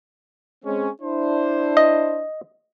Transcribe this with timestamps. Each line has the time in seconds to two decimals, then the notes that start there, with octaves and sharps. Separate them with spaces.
0.65 G#3 C4 C#4
1.01 D4 E4 C5
1.77 D#5